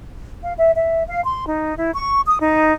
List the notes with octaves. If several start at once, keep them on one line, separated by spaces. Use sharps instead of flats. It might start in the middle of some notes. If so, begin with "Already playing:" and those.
F5
E5
E5
F5
C6
D#4
E4
C#6
D#6
D#4